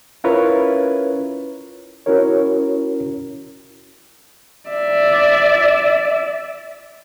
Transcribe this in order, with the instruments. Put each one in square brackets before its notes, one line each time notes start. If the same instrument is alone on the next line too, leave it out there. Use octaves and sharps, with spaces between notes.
[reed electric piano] C#4 E4 F4 A#4 B4 C#5
C#4 E4 F#4 A#4 C#5
[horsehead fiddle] D5 E5